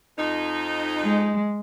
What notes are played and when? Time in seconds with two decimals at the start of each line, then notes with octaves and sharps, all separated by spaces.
0.18 F2 D#4
1.04 G#3